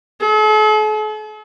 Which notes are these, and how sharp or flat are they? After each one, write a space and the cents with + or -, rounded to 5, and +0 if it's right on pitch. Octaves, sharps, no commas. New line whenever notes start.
A4 -45